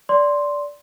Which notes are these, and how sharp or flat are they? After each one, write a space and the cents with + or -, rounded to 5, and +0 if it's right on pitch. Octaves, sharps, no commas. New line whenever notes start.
D5 -15 C6 +0